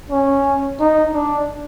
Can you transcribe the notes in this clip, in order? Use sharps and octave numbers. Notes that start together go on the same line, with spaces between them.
C#4
D#4
D4